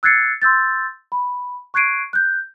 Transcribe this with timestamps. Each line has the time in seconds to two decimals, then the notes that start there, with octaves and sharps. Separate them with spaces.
0.03 E6 F#6 G#6 A6 C7 C#7
0.42 C6 E6 G6 A6
1.12 B5
1.74 C#6 F#6 G#6 C7 D7 D#7
2.13 F#6 G6